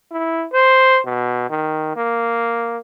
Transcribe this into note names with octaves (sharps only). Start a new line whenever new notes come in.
E4
C5
B2
D#3
A#3